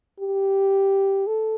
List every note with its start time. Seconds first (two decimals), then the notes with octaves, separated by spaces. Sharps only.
0.20 G4
1.27 A4